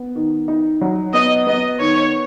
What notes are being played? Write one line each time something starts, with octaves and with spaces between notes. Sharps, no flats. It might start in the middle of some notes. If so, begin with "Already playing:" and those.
Already playing: B3
D#3
D#4
F#3
B3 D#5
B3 D#5
D#3 C#5